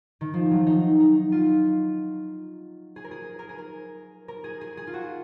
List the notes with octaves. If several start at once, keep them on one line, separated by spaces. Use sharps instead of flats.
D#3
F3
F#3
D#4
D#4
F4
G#4
A#4
G#4
A#4
G#4
A#4
A#4
G#4
G#4
G#4
F4
F#4